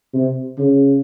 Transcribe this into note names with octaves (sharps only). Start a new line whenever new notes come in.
C3
C#3